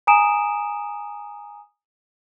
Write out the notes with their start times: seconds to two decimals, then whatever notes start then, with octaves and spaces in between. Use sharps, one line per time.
0.07 G#5 A#5 D#6 D7 E7